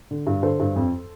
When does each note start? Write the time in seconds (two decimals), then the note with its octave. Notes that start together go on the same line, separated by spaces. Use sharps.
0.11 D3
0.27 G2
0.43 D3 A4 C5
0.60 G2
0.76 F2